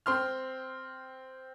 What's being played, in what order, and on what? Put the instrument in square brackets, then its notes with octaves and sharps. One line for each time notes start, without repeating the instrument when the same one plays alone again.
[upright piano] C4 C6 F6